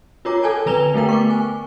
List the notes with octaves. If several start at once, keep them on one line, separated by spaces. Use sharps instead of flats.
F4 A#4 C#5 A#5 D6
A4 G#5 A5
D3 B4 A#5 F7 G7
A3 B3 A#4 G5
C#6 D6
G#5